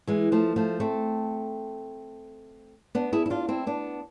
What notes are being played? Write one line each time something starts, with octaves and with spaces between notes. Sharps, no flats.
E3 G#3
F3 A3
F3 A3
A3 C4
B3 D4
E4 G#4
E4
D4 F4
C4 E4
B3 D4